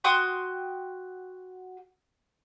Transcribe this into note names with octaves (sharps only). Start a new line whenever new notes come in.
F#4 G5 C6 D#6